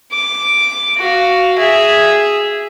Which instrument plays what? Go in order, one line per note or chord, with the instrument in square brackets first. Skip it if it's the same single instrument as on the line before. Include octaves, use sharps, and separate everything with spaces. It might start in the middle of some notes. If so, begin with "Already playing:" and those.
[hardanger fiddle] D6
F#4 F5
G#4 E5